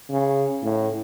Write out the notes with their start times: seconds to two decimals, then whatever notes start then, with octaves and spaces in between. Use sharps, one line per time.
0.10 C#3
0.63 A2